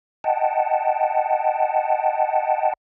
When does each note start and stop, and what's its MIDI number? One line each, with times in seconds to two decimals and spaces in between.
0.24 2.73 75
0.24 2.73 78
0.24 2.73 79
0.24 2.73 81